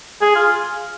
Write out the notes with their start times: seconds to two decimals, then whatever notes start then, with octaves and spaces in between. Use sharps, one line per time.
0.21 G#4
0.36 F4